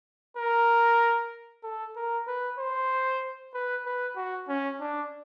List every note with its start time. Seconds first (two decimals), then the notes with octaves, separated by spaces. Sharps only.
0.37 A#4
1.64 A4
1.96 A#4
2.27 B4
2.59 C5
3.54 B4
3.86 B4
4.16 F#4
4.48 C#4
4.81 D4